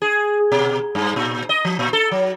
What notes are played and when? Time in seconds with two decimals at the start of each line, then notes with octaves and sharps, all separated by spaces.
0.02 G#4
0.52 B2
0.95 G2
1.16 A#2
1.49 D#5
1.65 F3
1.79 A#2
1.93 A4
2.11 F#3